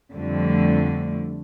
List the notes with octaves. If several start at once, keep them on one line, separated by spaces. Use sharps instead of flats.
F2 D3 G3 A3